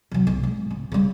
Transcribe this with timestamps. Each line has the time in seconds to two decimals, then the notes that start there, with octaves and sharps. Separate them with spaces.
0.12 C3 F#3
0.27 B1
0.43 G#2
0.70 C#3
0.92 C#3 G3